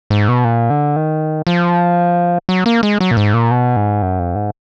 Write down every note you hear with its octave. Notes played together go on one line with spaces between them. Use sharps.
G#2
B2
A#2
D3
D#3
F3
F#3
A#3
G#3
F#3
A#2
G#2
A#2
B2
G#2
F#2
F2
G#2